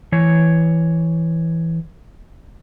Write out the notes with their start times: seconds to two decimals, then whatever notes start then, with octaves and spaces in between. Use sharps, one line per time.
0.12 E3 C#5